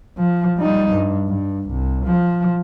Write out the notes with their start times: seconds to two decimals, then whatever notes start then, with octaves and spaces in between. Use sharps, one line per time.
0.18 F3
0.57 G3 D#4
0.92 G2
1.28 G2
1.70 C2
2.05 F3